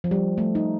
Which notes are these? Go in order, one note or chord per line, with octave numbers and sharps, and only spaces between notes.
F3
G3
A3
D#4